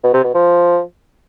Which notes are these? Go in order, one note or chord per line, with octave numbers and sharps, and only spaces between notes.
B2
C3
B2
F3